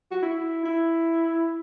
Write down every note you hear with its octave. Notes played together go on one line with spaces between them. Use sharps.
F#4
E4
E4